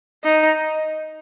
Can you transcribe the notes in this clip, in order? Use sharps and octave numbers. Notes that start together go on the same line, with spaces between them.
D#4